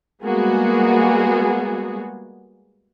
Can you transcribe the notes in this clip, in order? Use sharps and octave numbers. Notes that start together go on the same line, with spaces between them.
G3 G#3 A#3 B3 F#4 G#4